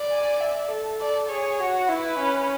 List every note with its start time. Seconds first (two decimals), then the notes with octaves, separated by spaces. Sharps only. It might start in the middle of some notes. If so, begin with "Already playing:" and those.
Already playing: D5
0.12 G#5
0.41 E5
0.71 A4
1.01 D5
1.30 G#4 C#5
1.60 F#4
1.89 E4 B4
2.19 C#4